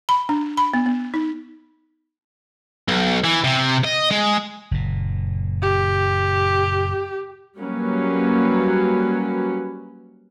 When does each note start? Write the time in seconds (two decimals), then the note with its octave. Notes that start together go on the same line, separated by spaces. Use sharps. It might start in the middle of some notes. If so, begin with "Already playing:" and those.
0.09 B5
0.29 D4
0.57 B5
0.74 B3
0.86 B3
1.14 D#4
2.88 B1
3.24 E3
3.44 C3
3.85 D#5
4.11 G#3
4.71 F#1 A#2
5.62 G4
7.59 F#3 G3 A#3 C#4 B4